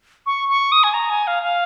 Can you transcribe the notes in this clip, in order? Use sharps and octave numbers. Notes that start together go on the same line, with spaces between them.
C#6
C#6
D#6
G#5
A#5
G#5
F5
F5